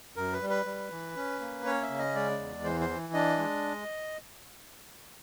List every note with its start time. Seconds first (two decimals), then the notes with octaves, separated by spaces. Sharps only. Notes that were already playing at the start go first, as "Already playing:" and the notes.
0.16 F#2 A#4
0.33 B4
0.41 G3
0.50 B4
0.66 G3
0.92 E3
1.16 C#4
1.40 A#3
1.65 C#4 C#5
1.82 E5
1.90 C#3
1.98 D#5
2.15 G#3 D5
2.39 E2
2.64 E3 C5
2.81 C5
2.89 E3
3.13 D4 D#5
3.38 G#3